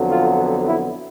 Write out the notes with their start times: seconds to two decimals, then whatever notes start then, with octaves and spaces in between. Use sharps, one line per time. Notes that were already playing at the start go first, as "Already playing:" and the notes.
Already playing: F2 D3 F#3 B3
0.09 F4
0.66 E4